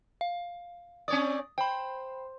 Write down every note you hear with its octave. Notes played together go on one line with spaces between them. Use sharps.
F5
C4 C#5 D5 D#6
C5 G5 B5